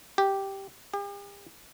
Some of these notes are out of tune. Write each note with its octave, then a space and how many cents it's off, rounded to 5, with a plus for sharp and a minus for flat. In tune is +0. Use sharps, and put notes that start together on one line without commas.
G4 -5
G4 +45